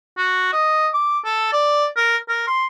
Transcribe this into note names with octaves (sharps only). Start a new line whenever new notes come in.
F#4
D#5
D6
A4
D5
A#4
A#4
C6